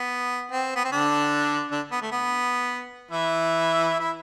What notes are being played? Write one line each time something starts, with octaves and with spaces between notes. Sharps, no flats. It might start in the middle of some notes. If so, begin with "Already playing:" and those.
Already playing: B3
C4
B3
C4
D3 D4
D3 D4
B3
A3
B3
E3 E4
E4